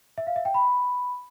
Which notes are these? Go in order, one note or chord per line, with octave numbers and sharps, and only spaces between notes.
E5
F5
E5
G5
B5